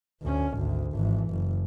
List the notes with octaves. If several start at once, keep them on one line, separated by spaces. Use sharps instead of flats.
D2 C#4
G#1 D2
G#1 E3
F#1